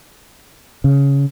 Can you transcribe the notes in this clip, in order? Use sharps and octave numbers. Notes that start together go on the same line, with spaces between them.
C#3